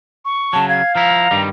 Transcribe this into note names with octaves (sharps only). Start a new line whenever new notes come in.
C#6
C#3 F#3 A5
F5 G#6
F3 E4 A#5
G2 D#3 G3